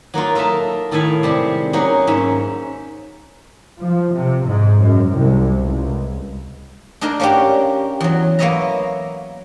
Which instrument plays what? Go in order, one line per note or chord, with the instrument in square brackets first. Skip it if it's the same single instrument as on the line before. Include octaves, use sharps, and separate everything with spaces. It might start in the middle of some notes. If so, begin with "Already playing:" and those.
[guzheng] F#3 A#3 D#4 F4
F4 A4 A#4 D#5 E5
A2 D#3 A4 F5 G#5 B5
C3 G3 G#3
F#3 A#3 C#4 D#4
G#2 C#4 E5
[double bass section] F3
C3
G#2
F#2
C2
C#2
[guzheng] D4 D#4 G#4 A#4 D#5
A#3 C#4 D4 F#4 G4
E2 F#3
A#3 B3 C#5 D#5 E5 A#5